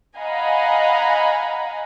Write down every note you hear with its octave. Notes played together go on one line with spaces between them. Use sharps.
D#5 F5 F#5 G#5 A#5 B5